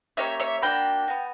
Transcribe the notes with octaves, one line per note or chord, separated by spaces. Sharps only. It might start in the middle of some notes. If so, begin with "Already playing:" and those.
A#3 C#4 G4 C#5 E5
C#5 E5
A#3 D4 F#4 G5 B5
B3 F#4